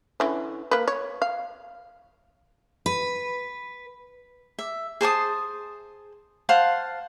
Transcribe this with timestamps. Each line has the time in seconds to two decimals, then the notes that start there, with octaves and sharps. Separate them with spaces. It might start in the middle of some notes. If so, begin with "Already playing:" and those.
0.20 D3 E3 C#4
0.71 A#3 B4
0.88 C#5
1.22 F5
2.86 B4
4.59 E5
5.01 G#4 C5 A5 D#6
6.49 C5 F5 F#5 A5